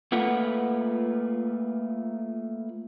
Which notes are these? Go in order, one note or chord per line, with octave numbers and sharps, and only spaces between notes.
A3 A#3 F4 B4 F#5